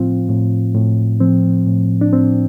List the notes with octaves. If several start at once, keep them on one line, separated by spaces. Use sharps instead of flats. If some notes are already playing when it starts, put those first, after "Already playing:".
Already playing: A2 F3 C4 F4
A2
A2
F3 C4
A2
D4
A2 C4